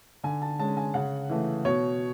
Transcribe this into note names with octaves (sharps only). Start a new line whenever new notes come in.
D3 G#5
A5
G#3 C#4 A5
G#5
C#3 F#5
E3 A3
B2 C#5